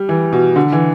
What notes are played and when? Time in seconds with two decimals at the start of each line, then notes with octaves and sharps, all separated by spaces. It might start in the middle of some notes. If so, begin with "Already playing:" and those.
Already playing: G3
0.09 E3
0.33 B2
0.56 D3
0.72 E3